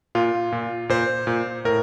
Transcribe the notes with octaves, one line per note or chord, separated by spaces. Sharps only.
A#2 F4
A#2
A#2 C5
A#2
A2 A#4